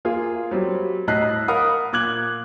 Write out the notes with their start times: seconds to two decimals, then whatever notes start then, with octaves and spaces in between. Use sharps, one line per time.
0.05 A#3 F4 G#4
0.51 F#3 G3 C4
1.07 A2 D#5 A5 F#6 B6 C7
1.48 A#4 F5 F#5 B5 D#6
1.92 A#2 D6 F#6 G#6 F#7